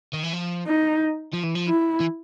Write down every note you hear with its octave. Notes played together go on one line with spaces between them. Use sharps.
D#3
E3
F3
D#4
F3
E3
F3
E4
E3